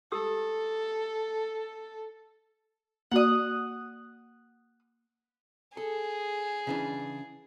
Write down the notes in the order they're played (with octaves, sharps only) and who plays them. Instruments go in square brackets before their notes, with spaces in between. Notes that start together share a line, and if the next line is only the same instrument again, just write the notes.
[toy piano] G4 D#6 E6 [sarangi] A4
[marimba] A#3 F#4 D5 [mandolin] F#5 D#6
[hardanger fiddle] G#4 [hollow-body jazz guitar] A4
[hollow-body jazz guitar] C#3 E3 D4